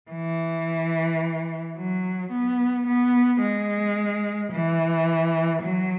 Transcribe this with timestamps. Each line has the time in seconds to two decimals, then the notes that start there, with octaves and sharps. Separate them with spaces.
0.11 E3
1.77 F#3
2.32 B3
2.87 B3
3.41 G#3
4.52 E3
5.62 F#3